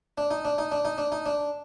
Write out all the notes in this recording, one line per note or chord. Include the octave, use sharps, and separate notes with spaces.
D4
D#4
D4
D#4
D4
D#4
D4
D#4
D4